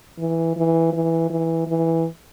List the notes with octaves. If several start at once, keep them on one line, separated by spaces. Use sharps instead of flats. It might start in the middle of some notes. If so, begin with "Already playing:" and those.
E3
E3
E3
E3
E3